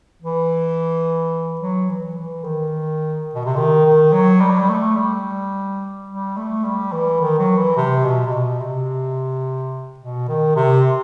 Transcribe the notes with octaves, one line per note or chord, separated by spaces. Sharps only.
E3
F#3
E3
E3
D#3
B2
C3
D#3
D#3
F#3
G3
F#3
G3
A3
G3
G3
A3
G3
E3
D#3
F#3
E3
C3
B2
C3
B2
C3
B2
D#3
C3